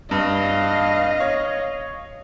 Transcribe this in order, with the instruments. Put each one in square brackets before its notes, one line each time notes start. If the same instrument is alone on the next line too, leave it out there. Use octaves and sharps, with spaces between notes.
[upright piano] G2 [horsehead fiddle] D#5 F5
[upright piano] C#5